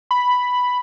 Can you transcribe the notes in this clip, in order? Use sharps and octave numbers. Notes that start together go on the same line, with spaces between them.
B5